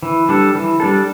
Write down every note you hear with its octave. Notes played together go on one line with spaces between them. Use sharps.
E3
G3 D4 A4
E3
G3 D4 A4